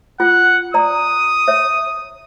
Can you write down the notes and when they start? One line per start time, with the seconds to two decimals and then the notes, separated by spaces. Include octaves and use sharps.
0.20 F4 F#5
0.74 D5 A#5 D#6
1.48 C#5 E5